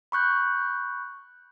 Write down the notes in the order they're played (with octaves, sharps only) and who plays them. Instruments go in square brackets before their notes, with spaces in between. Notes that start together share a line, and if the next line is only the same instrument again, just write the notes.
[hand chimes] B5 C#6 F#6 G6